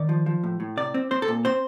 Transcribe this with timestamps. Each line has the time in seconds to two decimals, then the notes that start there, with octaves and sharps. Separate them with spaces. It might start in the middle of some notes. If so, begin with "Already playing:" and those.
Already playing: D#3 D5
0.09 F3
0.26 F3
0.44 A2
0.60 A2
0.77 C3 D5
0.94 C4
1.11 C4 C5
1.22 A4
1.28 A#2
1.45 C4 C5